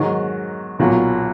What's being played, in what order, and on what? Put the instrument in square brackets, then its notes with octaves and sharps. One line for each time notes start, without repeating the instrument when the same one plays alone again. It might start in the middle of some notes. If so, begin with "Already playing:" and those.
Already playing: [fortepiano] G#2 D#3 F#3
B1 A#2 F#3